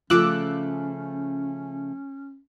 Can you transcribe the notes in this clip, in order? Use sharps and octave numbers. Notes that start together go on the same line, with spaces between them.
C#3 F3 A3 C#4 F4 D6 E6 F#6